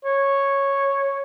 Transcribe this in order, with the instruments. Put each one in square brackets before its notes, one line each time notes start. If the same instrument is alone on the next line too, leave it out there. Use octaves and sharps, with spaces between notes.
[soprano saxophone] C#5